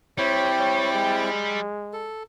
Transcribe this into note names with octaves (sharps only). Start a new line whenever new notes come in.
G3 C4 E4 C#5 G5
C#5
G#3
A4